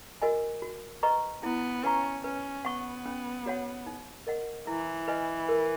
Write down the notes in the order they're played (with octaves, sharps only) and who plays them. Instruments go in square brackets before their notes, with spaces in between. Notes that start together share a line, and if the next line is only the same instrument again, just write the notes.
[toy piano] F#4 A#4 D#5 G#5
F#4
B4 D#5 A#5 C#6
[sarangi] B3 [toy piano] E4
[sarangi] C#4 [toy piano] B4 F#5 A#5 C#6
[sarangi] C#4 [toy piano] B4
[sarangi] B3 [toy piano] F#5 C#6
[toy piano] C#4
F#4 C#5 F#5
D#4
A#4 D#5 F#5
[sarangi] E3 [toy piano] E4
[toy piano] B4 D#5 G#5
A#4